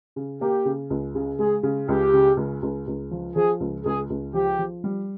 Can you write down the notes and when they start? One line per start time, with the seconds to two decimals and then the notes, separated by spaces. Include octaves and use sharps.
0.16 C#3
0.41 A#3 G4
0.65 C#3
0.90 C#2
1.15 C#3
1.39 G#3 G#4
1.63 C#3
1.88 C#2 G4
2.13 C#3
2.37 C#2
2.63 C#2
2.87 C#2
3.11 F3
3.36 F3 G#4
3.60 C#2
3.85 C#2 G#4
4.10 C#2
4.34 F3 G4
4.59 F3
4.84 G3